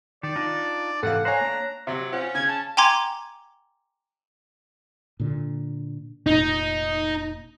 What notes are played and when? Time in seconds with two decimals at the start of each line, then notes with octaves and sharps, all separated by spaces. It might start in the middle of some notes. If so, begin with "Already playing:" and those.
0.23 D#3 D5
0.36 D4 D#4 F4
1.03 G#2 C3 E3 A4 F5 F#5
1.25 C5 C#5 F5 G#5 A#5 F#6
1.41 A#3 D4
1.87 C3 F#3
2.12 C4 C#4 F4 F#5
2.35 C#3 G#6
2.48 A5
2.77 G5 G#5 A#5 C6 D6 G#6
5.20 A#2 D3
6.27 F1 A#2 D#4